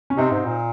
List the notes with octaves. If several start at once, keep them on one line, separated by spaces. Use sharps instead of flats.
C#4
C3 C4 D#4
G#2
A#2